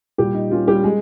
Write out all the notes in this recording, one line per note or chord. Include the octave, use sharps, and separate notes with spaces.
A#2 G3 G4
D#4
G3 A#3 C#4 F4
G3 G4
G#3 G#4